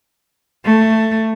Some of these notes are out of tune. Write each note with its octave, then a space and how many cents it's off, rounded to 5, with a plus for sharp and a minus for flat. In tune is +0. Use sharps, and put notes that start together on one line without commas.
A3 +10